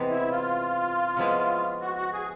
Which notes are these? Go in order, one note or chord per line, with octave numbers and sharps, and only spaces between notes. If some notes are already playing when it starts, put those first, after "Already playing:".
Already playing: C3 E3 G#3 B3
E4
F4
C#3 F3 G#3 B3 E4
F#4
F#4
G#4